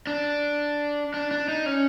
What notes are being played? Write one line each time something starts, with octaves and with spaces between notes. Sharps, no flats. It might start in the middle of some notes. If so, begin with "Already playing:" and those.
D4
D4
D4
D#4
C#4